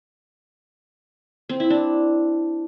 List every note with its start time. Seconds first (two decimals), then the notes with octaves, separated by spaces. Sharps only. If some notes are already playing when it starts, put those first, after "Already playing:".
1.49 C4
1.60 E4
1.70 D4